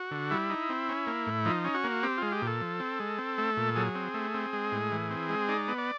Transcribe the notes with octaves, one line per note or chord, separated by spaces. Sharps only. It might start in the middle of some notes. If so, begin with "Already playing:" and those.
Already playing: F#4
D3
G3 E4
D#4
C4
C#4
A#3
A2
F3 D#4
C#4
F#4
A#3
C4 G4
G#3 F4
G4
A#2 A4
F3
C4
G#3
C4
A3
A#2
F#3 G#4
C4
A3
C4
G#3
A2
E3
C4
G#3
D#4 D5
B3
D5